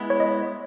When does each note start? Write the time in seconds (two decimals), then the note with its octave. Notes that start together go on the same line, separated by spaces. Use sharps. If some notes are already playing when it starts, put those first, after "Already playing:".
Already playing: G#3 B3 E4
0.10 C#5
0.20 D#5